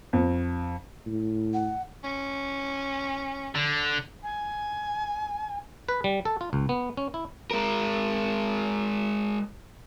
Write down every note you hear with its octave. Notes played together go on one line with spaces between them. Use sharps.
F2
A2
F#5
C#4
D3
G#5
B4
G3
A4
F4
C#2
B3
C#4
E4
G#3 A#4